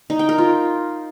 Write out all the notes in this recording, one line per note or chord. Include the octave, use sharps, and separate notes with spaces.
D#4
G5
A#4
F4